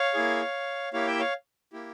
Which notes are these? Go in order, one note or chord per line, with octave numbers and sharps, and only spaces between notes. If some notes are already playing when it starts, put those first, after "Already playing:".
Already playing: C#5 F5
A#3 E4 G#4
A#3 E4 G4 C#5 F5
E5 G5
C#5 F5
A#3 E4 G4